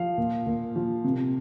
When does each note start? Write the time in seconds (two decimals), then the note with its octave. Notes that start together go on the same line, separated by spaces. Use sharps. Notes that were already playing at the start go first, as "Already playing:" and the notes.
Already playing: F3 F5
0.18 A#2
0.47 A#2
0.76 F3
1.04 C3